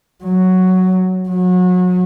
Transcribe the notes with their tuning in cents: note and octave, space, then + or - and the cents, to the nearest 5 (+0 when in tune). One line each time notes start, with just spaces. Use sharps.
F#3 +0
F#3 -30